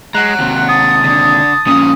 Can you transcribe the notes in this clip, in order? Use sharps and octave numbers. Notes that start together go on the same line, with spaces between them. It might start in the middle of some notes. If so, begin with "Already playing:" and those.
G#3 F#5 A#5 F#6
D#2 C3
A5 D#6
D3
F2 A#2 C#4 D#6